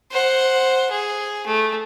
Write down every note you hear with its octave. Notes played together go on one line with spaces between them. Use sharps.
C5 F#5
G#4
A3